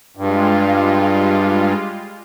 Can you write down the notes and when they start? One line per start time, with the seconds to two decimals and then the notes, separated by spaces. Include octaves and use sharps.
0.17 G2 G3 G#3 F4